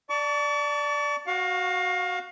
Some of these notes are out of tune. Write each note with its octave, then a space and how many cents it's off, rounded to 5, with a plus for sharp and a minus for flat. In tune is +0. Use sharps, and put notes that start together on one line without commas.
D5 +0 A5 +15 C#6 +45
F#4 +0 F5 +30 C#6 -10